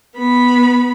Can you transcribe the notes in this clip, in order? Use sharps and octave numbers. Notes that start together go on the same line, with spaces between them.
B3 B5